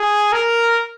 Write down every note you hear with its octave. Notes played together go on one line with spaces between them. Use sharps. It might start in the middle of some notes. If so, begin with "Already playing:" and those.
Already playing: G#4
A#4